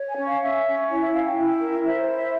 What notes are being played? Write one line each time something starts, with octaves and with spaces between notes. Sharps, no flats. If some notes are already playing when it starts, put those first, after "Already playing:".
Already playing: C#5
G#5
C#4
F5
C#4 E5
C#4
E4 C#5
E5
C#4 F5
G5
E4
A#4
C5 E5
C#5
E4
E5